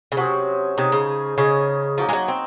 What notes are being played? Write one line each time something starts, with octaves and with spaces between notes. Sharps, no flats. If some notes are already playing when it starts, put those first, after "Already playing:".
C#3
C3 F#3 C#4 G#4 C5
C3 D#4 G#4 D#5
C#3
C#3 C#4 G#4 D#5
F3 A#3 D#4 F#4 A#4
G#3
F#3
C4